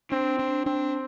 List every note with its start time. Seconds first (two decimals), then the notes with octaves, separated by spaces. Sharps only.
0.12 C4 D4
0.39 D4
0.66 C4 D4